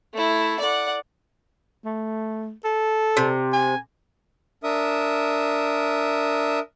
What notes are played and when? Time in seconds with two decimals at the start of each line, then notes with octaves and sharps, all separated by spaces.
0.14 A3 E4
0.59 D5 F#5
1.85 A3
2.64 A4
3.17 C3
3.53 G#5
4.63 D4 A#4 E5 D#6